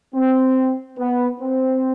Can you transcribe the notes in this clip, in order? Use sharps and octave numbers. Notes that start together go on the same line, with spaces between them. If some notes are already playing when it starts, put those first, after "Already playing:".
C4
B3
C4